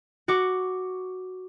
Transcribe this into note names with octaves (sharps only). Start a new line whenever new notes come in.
F#4 C#6 D6